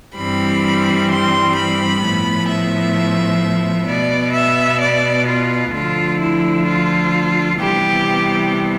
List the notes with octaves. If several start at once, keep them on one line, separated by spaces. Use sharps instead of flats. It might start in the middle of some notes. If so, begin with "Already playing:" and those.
G2 E3 G3 C4 B5
C6
B5
A2 F3 B3
E5
B2 B3 D5
E5
D5
F4
D2 D3 F3 F4
E4
F4
C3 E3 G3 B3 G4